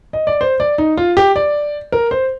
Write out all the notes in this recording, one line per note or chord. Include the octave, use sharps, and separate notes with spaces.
D#5
D5
C5
D5
D#4
F4
G4
D5
A#4
C5